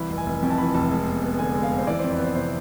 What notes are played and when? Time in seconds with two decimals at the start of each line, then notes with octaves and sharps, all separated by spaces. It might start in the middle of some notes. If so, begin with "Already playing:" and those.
Already playing: C2 E3 B5
0.10 F1
0.18 G#5
0.26 F1
0.42 F2
0.50 A5
0.58 E3 B5
0.74 F1 A5
0.91 G#3
1.07 E2
1.22 B3
1.39 D3 G#5
1.55 G#3
1.63 F5
1.71 E2
1.78 C5
1.87 E3 D5
1.99 F2 C5
2.12 B4
2.19 B3 C5
2.35 C3 C5